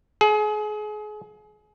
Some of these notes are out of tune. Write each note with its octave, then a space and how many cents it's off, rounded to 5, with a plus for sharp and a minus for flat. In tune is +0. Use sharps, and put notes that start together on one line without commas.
G#4 +30